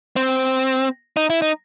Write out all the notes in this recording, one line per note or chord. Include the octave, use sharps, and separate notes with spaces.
C4
D#4
E4
D#4